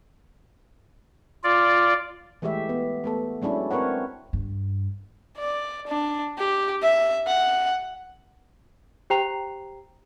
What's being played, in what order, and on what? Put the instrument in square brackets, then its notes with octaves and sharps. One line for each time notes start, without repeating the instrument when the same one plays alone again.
[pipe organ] F4 D5
[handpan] E3 G#3 A3 G4 E5
B3
A3 B3 A4
F#3 G#3 C#4 D4 E4
C4 A#4 B4 C#5 F#5
[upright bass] G2
[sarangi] D5
D4
G4
E5
F#5
[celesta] G4 C5 G5 A#5 C7 F7